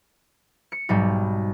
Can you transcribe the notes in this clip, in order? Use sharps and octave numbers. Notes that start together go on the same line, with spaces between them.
C#7
B1 G#2 G3